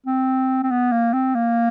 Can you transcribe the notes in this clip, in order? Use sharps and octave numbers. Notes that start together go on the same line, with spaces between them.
C4
C4
B3
A#3
C4
A#3